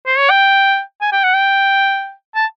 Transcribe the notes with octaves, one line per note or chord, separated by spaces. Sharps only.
C5
C#5
G5
G#5
G5
F#5
G5
A5